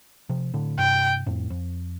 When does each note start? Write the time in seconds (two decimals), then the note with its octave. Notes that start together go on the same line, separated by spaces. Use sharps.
0.29 C3 F3
0.54 A2 D3
0.78 G2 C3 G5
1.26 F2 A2
1.50 F2